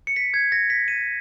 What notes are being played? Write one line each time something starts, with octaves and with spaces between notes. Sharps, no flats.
C#7
B6
G#6
A#6
B6
D#7